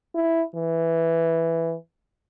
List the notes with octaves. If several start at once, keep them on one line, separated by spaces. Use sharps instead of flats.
E4
E3